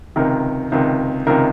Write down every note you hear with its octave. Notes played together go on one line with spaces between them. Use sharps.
C#2 C3 D#3 A#4
C#2 C3 D#3
C#2 C3 D#3 A#4